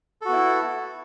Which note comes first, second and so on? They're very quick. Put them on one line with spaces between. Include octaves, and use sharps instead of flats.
A4 F#4 B3 E4